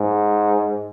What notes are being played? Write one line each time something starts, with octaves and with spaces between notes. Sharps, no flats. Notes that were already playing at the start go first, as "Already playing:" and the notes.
Already playing: G#2